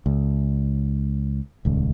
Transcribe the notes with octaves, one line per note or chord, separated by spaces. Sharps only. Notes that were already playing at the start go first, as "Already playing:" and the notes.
C#2
D#1 C#2